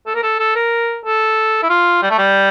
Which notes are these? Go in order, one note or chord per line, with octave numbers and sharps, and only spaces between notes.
A4
A#4
A4
A4
A#4
A4
E4
F4
G3
A3
G3